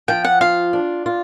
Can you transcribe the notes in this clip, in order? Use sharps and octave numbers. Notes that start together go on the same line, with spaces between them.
F3 G5
F#5
F4 F5
D4
F4